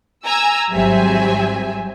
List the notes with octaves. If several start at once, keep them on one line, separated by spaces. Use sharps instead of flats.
G#5 A#5 E6
G#1 F#3 G3 C4 E5 G#5